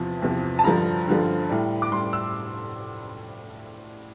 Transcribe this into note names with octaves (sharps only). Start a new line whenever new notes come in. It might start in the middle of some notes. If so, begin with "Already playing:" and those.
Already playing: E2 C3 F3
E2 C3 F3
A5
G2 D3 F3 A#5
G2 D3 F3
A2 G3
D6
A2 G3 C6
E6